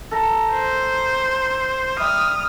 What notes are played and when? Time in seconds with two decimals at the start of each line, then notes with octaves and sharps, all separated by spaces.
0.11 A4 A#4 A#5
0.52 C5
2.00 G3 E5 D#6 F6